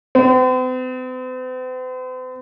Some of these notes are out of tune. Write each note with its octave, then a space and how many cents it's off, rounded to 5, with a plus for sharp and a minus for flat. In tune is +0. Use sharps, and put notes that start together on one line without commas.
C4 -45